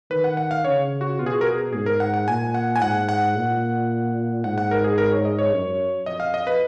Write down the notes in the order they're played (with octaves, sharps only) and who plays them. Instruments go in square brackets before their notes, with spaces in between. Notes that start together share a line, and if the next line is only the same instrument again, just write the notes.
[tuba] D#3 [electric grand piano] B4
[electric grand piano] F#5
F#5
F5
[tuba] C#3 [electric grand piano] C#5
[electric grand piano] F#4
[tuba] B2 [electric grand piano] F4
[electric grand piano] G#4
F#4
A#4
G#4
[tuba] G#2 [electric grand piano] G#4
[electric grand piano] A#4
F#5
F#5
[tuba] A#2 [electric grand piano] G#5
[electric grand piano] F#5
G#5
[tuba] G#2 [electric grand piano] F#5
[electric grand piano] F#5
[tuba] A#2
[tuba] G#2 [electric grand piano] F#5
[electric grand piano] F#5
A#4
G#4
A#4
C#5
D#5
C#5
[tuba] F#2
[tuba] F2 [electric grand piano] D#5
[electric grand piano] F5
D#5
B4